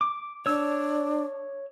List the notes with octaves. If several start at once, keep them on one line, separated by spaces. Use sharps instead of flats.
D6
D4 C#5 E6